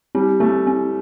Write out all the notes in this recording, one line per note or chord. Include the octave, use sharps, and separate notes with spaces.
G3 C4
A3 C4
C4